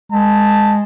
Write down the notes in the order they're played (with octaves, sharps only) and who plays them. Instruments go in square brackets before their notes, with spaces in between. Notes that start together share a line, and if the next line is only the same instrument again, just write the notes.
[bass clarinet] G#3 [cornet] A5